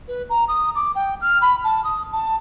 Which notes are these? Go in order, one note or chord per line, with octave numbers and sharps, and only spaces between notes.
B4
A#5
D#6
D6
G5
F6
B5
A5
D#6
A5